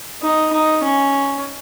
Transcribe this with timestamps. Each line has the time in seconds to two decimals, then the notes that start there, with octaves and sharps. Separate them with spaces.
0.22 D#4
0.53 D#4
0.84 C#4